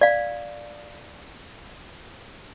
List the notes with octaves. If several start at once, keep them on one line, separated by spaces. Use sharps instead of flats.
D5 F5